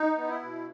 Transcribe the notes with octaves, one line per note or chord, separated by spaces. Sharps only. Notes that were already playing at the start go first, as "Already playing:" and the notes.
Already playing: D#4
B3
E4
B2